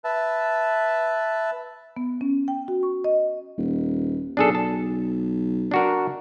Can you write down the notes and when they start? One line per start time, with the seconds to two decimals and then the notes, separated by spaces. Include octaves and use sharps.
0.04 B4 E5 A5
1.97 B3
2.21 C#4
2.48 G5
2.68 F#4
2.83 C#6
3.04 D#5
3.57 D#1
4.37 B1 D4 G#4 A4
4.55 A5
5.71 D4 F#4 A#4